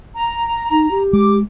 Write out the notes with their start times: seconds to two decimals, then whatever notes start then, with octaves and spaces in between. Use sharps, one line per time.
0.16 A#5
0.71 D#4
0.91 G4
1.13 G#3 D6